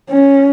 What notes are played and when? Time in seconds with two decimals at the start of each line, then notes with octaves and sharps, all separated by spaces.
0.10 C#4